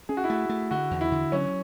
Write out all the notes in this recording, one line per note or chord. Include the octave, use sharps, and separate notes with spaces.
C#4 G#4
F#4
E4
A3 F#4
A3
D3 F#4
E2
E4
D3
F#3 C#4